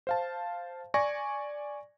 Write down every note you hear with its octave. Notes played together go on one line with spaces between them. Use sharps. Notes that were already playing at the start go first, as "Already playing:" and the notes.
C5 F5 A5
D5 G#5 C#6 A#6